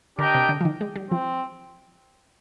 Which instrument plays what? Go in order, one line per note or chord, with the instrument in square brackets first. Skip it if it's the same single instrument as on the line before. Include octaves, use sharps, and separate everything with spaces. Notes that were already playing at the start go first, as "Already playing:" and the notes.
[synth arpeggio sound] D3 [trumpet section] D4 G4 A#4 D#5 G5
[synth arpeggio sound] C3
D3
F3
D#3
G#3
G3
[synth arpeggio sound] F3 [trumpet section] C4